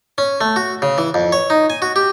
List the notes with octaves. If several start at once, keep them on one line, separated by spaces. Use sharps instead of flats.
C#4
A3
F#4
C#3
E3
F2
C#5
D#4
G#5
F#4
G4